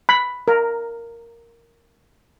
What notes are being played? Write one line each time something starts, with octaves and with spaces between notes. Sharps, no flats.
B5
A#4